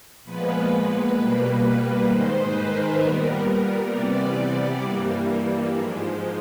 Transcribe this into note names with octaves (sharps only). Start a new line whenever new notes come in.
A#2 F3 G#3 B3 B4
B4
B2 G3 A#3
G#2 D#3 G#3 C5
B4
A#4
A#2 G3 B3
C3 E3 G3 B3 D5
G2 E3 G3 A#3
G#2 F3 G#3